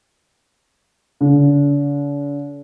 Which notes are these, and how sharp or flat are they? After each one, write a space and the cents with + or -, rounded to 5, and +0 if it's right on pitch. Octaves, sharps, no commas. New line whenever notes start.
D3 -45